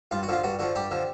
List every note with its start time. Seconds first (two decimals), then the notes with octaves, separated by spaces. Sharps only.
0.11 G2 F4
0.23 F#4
0.28 D3 F3 F4
0.44 G2 F#4
0.59 D3 F3 F#4
0.75 G2 G4
0.91 D3 F3